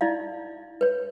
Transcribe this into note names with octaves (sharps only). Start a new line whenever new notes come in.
D#4 E4 D5 F5
B4 C#5